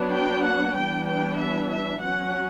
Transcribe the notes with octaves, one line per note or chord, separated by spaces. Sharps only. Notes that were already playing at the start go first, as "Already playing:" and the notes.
Already playing: F#3 B3 D4
G5
F#5
E3 G3 B3 D4 G5
G5
E5
E5
F#3 C#4 F#5